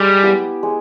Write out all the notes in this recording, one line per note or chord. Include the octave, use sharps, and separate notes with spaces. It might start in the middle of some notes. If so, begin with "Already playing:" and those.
Already playing: G3 G#3
B3 E4 G4
G#3